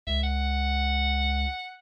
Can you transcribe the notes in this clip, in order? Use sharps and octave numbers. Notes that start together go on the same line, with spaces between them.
C#2 E5
F#5